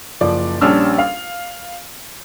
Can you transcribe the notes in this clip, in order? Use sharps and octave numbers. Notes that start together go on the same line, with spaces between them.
F#1 F3 D5
A#1 G3 C#4 D4 E6 F6
F5